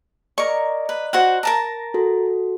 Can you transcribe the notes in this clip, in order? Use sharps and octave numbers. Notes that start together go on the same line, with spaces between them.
A#4 D5 D#5 A#5 C#6
B4
F#4 C5 F#5
A#4 A5 A#5
F#4 A4